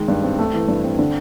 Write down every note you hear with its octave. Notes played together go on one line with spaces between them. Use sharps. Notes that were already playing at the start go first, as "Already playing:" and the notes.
Already playing: D#3 G#3
G2
C4
A3
E3
G2
C4
D3